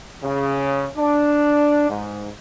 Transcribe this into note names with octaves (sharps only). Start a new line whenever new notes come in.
C#3
D4
G#2